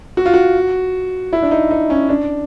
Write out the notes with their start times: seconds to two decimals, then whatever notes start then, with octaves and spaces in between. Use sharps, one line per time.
0.17 F#4
0.26 F4
0.34 F#4
1.33 E4
1.42 D4
1.51 D#4
1.71 D#4
1.90 C#4
2.09 D4